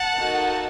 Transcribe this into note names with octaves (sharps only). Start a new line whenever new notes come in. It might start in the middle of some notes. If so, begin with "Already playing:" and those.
Already playing: F#5 A5
A#3 D#4 F#4 A4